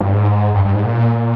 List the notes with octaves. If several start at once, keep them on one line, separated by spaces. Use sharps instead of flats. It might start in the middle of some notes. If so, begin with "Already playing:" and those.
G2
G#2
G2
G2
G#2
A#2